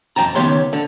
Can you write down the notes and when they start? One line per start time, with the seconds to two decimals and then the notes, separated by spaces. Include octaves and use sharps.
0.16 F2 F3 G5 A5 A#5
0.35 C#2 D#3 B3 G4 C#5 C6
0.73 D3